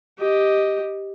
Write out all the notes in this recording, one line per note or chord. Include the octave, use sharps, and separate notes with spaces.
G4 D#5